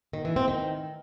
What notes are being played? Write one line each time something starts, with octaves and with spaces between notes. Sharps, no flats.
D#3
E3
C4
D#3